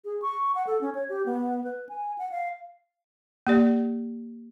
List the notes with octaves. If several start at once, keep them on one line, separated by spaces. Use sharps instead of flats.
G#4
C#6
F#5
A4
C#4
C#5
G4
B3
B4
G#5
F#5
F5
A#3 G4 D5